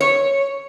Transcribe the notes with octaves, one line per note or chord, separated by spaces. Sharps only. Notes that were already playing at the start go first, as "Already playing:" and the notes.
C#5